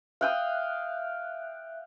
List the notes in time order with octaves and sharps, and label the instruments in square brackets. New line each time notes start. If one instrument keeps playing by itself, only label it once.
[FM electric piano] E5 F#6 [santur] F5 G5 D#6